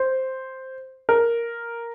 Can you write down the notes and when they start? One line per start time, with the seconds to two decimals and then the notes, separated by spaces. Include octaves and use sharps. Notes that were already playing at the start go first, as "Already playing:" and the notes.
Already playing: C5
1.09 A#4